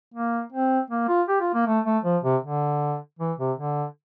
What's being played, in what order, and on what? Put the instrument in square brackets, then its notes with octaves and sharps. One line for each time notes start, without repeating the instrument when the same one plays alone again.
[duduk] A#3
C4
A#3
F4
G4
F4
A#3
A3
A3
F3
C3
D3
E3
C3
D3